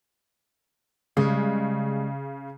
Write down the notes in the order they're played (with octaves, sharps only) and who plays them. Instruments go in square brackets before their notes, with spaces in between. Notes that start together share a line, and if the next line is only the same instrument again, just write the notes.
[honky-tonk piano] C#3 [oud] G3 G#3